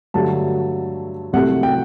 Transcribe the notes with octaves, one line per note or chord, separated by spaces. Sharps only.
G2 D3 F#3 A3 A5
C2 C3 F#3 A3 F#5
G5